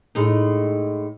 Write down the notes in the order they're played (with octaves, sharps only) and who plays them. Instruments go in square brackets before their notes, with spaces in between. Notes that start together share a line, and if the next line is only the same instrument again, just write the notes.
[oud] A2 G#3 D#4